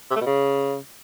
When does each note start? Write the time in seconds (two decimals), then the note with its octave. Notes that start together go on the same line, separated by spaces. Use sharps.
0.10 C3
0.16 A3
0.21 B2
0.26 C#3